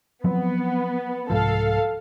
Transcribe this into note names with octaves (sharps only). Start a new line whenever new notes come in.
F3 F#3 B3 C4
C2 G#2 F3 A4 F5